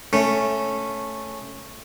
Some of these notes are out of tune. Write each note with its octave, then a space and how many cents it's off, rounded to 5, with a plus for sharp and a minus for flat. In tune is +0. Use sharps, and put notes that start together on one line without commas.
A3 +0 C#4 -5